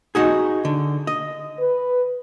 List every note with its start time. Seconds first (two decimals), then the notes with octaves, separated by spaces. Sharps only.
0.15 D#4 F#4 G#4
0.65 D3
1.07 D#5
1.60 B4